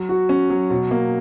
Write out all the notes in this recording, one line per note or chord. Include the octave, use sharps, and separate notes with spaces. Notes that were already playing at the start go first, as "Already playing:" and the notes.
Already playing: F#3
F#4
C#4
F#3
B2
A#3